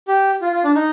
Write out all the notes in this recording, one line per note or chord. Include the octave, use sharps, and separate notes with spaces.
G4
F4
F4
D4
D#4